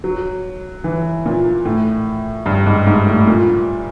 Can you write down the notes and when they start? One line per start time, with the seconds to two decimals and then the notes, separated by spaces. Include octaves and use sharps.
0.04 F#3
0.84 E3
1.26 A#2
1.65 A2
2.46 G2
2.66 G#2
2.86 G#2
3.07 A2
3.27 A#2